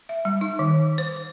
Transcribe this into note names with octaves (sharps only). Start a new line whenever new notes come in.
E5
G3
D#4
D#3
C5